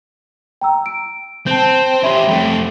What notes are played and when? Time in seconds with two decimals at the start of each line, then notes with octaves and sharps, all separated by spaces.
0.61 G5 A#5 E6
0.86 D7
1.47 C4 A5 G6
2.03 C#4 G4 E5 B5 C6
2.28 F2 A3 G5